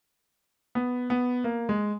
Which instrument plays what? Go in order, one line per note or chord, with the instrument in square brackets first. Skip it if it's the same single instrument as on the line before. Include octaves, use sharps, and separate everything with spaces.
[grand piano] B3
B3
A#3
G#3